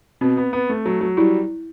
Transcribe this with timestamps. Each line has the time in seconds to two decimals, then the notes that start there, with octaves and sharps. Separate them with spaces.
0.21 B2 C4
0.37 B3
0.53 B3
0.69 A3
0.86 F#3
1.01 F#3
1.17 G3 E4